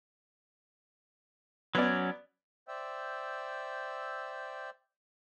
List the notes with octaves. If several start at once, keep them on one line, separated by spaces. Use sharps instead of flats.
F#3 B3 C#4 D5
C5 D5 E5 G5 E6